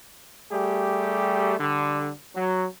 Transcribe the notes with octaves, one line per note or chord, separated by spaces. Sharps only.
G3 A3 G4 G#4
D3 G3
F#3